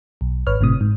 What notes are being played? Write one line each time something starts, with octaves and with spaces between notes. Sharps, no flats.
B1
G#1 B4 C#5 F6
G1 A2 C3 D#6
G#2